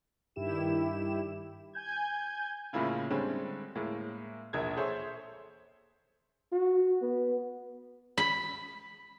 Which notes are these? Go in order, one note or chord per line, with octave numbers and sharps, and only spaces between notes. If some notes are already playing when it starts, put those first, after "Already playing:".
G2 D#3 E4 G4 E7
G#5 G6 G#6
A2 C#3 A#3 E4 F4
D3 G3 G#3 C4 C#4
A2 G#3 A#3
E1 A#1 A#4 E5 G#6
G#4 A4 C5 C#5 E5
F#4
B3
B5